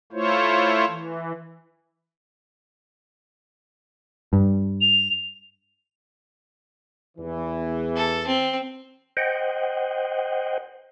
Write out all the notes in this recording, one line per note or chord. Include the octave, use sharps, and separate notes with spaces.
A3 E4 F4 C5 C#5
E3
G2
F7
E2 E3
A4
C4
C5 D#5 F#5 G5